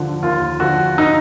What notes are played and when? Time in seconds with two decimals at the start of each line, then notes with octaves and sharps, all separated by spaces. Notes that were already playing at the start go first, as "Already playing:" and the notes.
Already playing: D#2 D3 F3
0.22 D#2 F4
0.60 D3 F3 F#4
0.98 D#4